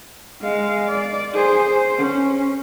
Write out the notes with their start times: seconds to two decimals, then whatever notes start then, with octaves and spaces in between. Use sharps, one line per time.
0.42 G#3 F5
0.88 D5
1.34 G#4 C5
1.69 C5
1.98 C#4